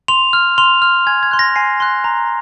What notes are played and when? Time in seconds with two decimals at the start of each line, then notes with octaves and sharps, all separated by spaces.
0.08 C6 F7
0.33 F6
0.58 C6 F7
0.82 F6
1.07 G#5 G#6
1.23 G#6
1.31 C6 F#6
1.39 A#6
1.56 G#5 C7
1.80 C6 F#6
2.04 A#5